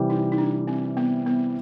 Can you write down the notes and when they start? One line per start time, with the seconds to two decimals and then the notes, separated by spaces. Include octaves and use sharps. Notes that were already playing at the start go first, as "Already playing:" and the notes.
Already playing: C3 E3 G3
0.10 D#4
0.32 D#4
0.38 D4
0.67 C4
0.97 B3
1.26 B3